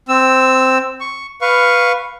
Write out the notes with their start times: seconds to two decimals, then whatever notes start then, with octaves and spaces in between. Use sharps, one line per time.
0.08 C4 E6
1.01 C#6
1.41 B4 F5 C#6